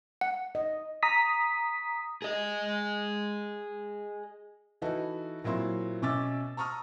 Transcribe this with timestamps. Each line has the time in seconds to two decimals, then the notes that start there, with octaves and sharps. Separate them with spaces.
0.21 F#5
0.55 D#5
1.03 A#5 D#6 B6
2.22 G#4 D#5
4.82 E3 D#4 E4 F#4 A4 B4
5.44 A#2 F#3 C4 E4 C6
6.02 B2 C#4 E5 D6 E6 A6
6.57 A5 A#5 C#6 D#6 F6